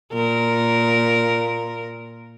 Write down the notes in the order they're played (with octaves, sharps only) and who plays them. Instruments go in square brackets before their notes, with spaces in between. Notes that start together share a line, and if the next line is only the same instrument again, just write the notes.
[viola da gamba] A#2 A#4